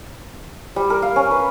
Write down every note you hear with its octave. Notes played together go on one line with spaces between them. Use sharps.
G3
A#4
F5
C#4
B4